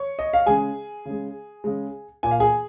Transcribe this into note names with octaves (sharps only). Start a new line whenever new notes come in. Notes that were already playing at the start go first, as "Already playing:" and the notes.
Already playing: C#5 C#6
D#5
F5
C#3 G#3 G#4 G#5
C#3 G#3
C#3 G#3
A#2 A#3 G#5
F5
G#4 G#5